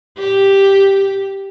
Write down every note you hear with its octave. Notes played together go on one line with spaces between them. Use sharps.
G4